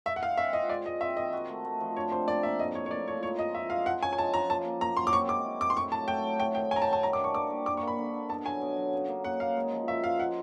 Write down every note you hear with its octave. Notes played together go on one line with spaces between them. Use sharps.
G#3 E5
F#5
G#3 F5
C4 E5
F4 D#5
G#3 D5
G#3 D#5
C4 E5
D#3 D#5
F#4
A3
A3
F3
D4 C#5
C3 C5
A#3 D5
A#3 E5
A2 D#5
A2 C#5
C#5
A#3 D5
F3 C#5
G#3 C#5
F4 D#5
F4 E5
G#3 F5
F3 F#5
C#4 G#5
G#5
G#3 A5
F3 A#5
A#3 A5
A#3
A#3 A#5
F#3 C6
D6
C4 C#6
G#3 D6
E4
C4 D6
C6
A2 C#6
F#3 A5
A3 G5
F#3
A3 G5
D#3 G5
F#3 G#5 A#5
A5
D#3
A5
G3 A#5
D6
D4
C#6
A#3 D6
G3
A#3 D6
C#6
A#3
B5
D3
D3
B2 A5
F#3 G#5
B2
F#3
C#3
A#3
C#3 F#5
A#3 F5
G#3
F3
F3 E5
G#3 F5
F4 F#5